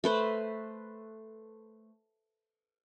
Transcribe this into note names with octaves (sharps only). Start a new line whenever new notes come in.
A3 B4 C5